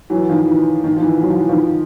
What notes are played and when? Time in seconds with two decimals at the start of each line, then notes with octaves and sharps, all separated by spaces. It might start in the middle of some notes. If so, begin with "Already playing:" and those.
0.10 E3 F#3
0.29 D#3 F3
0.47 E3
0.84 D#3
0.96 F3
1.02 E3
1.22 F#3
1.30 F3
1.40 E3
1.49 D#3 F3